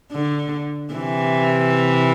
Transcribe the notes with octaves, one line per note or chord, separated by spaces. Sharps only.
D3
C3 E3